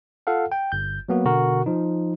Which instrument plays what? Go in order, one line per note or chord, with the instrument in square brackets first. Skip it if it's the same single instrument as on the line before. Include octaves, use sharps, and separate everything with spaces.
[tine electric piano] F4 A4 F5 F#5
G5
G1 G6
F#3 A#3 B3 F#4
B2 D3 F#4 A#4
F3 D#4